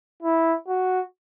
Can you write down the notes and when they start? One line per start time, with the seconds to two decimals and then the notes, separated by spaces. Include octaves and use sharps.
0.22 E4
0.68 F#4